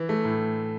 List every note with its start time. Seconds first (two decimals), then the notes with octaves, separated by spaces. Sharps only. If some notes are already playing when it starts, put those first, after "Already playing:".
Already playing: E3
0.09 A3
0.25 A2